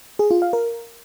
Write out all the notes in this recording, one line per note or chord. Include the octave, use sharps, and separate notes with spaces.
G#4
F4
F5
A#4